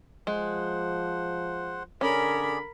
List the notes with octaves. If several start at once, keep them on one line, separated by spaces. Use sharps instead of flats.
F3 G#3 C5 F#5
D3 C#4 G#4 A#4 D5 B5